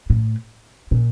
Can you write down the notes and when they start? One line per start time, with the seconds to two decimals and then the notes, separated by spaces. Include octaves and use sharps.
0.10 A2
0.91 A#2